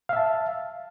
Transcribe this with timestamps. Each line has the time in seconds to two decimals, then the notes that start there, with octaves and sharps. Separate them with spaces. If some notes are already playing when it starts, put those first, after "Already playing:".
0.09 F5
0.13 E5
0.16 A5